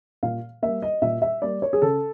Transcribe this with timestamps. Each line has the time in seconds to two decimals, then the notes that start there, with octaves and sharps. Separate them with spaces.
0.23 A#2 F5
0.62 G3 A#3 E5
0.82 D#5
1.02 A#2 E5
1.22 E5
1.42 G3 A#3 D5
1.62 C#5
1.73 G#4
1.82 C#3 A4